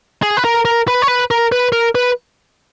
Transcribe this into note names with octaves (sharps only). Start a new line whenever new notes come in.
G#4
B4
A#4
A#4
B4
C#5
B4
A#4
B4
A#4
B4